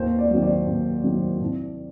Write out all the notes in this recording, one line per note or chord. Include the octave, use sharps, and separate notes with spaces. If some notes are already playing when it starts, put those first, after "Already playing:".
Already playing: D#2 C5
D5
D#3 F#3
D5
D#2
D#3 F#3
C2